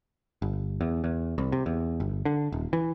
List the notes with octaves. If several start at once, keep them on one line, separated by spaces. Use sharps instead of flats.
G1
E2
E2
C2
C3
E2
G1
D3
D#1
E3